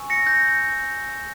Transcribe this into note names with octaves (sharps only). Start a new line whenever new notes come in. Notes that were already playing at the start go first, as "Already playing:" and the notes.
Already playing: G#5 C#6 E6
A#6 C#7
G6 A#6